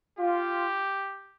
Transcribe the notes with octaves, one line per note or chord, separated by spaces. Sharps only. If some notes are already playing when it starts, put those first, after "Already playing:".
F4 G4